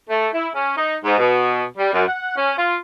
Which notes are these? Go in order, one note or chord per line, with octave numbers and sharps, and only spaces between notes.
A3
E4
C#4
D#4
G#2
B2
G3
F#2
F#5
C#4
F4